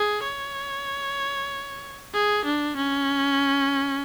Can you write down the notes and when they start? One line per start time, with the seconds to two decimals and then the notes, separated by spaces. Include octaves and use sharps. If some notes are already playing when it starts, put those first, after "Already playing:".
Already playing: G#4
0.24 C#5
2.14 G#4
2.45 D4
2.77 C#4